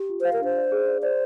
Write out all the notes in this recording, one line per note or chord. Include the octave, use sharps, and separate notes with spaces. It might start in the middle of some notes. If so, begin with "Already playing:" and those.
Already playing: G4
F4
C5 F5
A#4
D4 C5
D5
G#4
D5
C5 D5